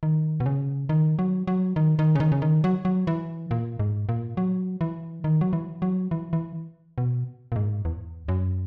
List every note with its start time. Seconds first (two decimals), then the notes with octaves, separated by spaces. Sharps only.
0.03 D#3
0.40 B2
0.46 C#3
0.89 D#3
1.19 F#3
1.47 F#3
1.76 D#3
1.99 D#3
2.15 C#3
2.20 D#3
2.32 C#3
2.42 D#3
2.64 F#3
2.85 F#3
3.07 E3
3.51 A#2
3.79 G#2
4.09 A#2
4.37 F#3
4.81 E3
5.24 D#3
5.41 F#3
5.53 E3
5.82 F#3
6.11 E3
6.33 E3
6.98 B2
7.52 A#2
7.56 G#2
7.85 E2
8.28 F#2